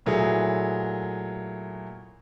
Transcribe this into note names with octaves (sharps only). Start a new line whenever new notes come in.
A#2 F#3 A3 E4 G#4